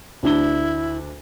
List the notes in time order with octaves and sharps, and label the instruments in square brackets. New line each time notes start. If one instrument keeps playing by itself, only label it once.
[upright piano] D2 D4 G7 [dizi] E4